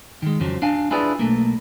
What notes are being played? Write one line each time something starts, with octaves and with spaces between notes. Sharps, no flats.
D#3 G#3
F2 C#3 F3 F#3
D4 F5 G#5
D4 E4 F4 G#4 B4 D5
B1 A3 A#3